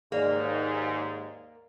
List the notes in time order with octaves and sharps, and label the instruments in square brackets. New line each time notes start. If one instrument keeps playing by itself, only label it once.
[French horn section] D#2 G#2 [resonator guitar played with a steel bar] A#3 [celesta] G#4 D5